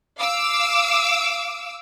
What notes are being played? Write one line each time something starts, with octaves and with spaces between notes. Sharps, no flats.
F5 D6 E6